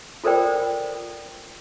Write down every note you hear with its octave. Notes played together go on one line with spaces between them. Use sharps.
F4 A4 A#4 C5 D5 G5